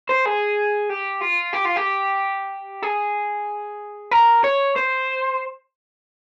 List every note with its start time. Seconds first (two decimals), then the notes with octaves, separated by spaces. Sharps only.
0.09 C5
0.26 G#4
0.90 G4
1.22 F4
1.54 G4
1.66 F4
1.77 G4
2.83 G#4
4.11 A#4
4.44 C#5
4.76 C5